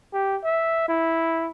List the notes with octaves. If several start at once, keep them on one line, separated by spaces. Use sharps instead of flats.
G4
E5
E4